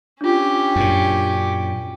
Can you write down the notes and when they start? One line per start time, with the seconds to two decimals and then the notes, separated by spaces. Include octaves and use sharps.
0.21 C#4 D4 F4 G4
0.76 F#2 A#2